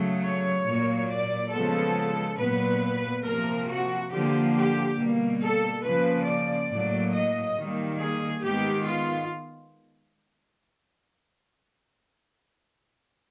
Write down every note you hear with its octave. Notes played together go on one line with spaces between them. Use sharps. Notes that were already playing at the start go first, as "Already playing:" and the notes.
Already playing: C#3 F#3 A3
C#5
A#2 F#3 A#3
D5
C#3 F3 G#3 B3 A4
A#2 F#3 B3 B4
C3 F3 A#3 A#4
F#4
D3 F3 A#3 G4
G4
B2 G3 A#3
A4
C#3 F3 A#3 B4
D5
A2 F#3 A#3
D#5
D#3 G3 A#3
G#4
D#3 G#3 B3 G4
F4